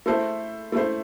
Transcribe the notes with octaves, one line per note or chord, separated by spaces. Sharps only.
A3 E4 A4 C5
A3 E4 A4 C5